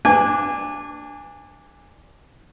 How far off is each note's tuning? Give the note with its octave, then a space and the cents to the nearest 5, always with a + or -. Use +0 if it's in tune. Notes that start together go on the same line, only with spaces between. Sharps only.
D4 +0 G#5 -30 D6 -35